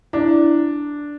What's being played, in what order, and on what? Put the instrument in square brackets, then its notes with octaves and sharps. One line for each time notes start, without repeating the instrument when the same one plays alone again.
[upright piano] D4 [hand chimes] E4